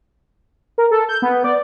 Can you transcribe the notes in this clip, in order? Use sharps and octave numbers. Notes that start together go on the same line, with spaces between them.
A#4
A4
G6
B3
D5